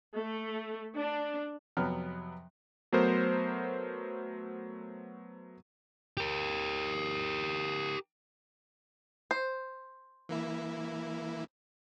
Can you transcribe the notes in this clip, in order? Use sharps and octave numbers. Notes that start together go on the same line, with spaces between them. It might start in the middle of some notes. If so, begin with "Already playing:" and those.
A3
D4
F2 C3 F#3 B3 F6
F#3 A3 B3 A#4 C5
G4 A#4
C5
E3 A#3 E4